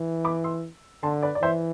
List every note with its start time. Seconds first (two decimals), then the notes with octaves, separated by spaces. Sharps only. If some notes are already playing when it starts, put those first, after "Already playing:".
Already playing: E3
0.24 B5 D6
0.44 C6 E6
1.03 D3 A5 C6
1.23 B4 D5
1.35 D5
1.42 E3 C5 E5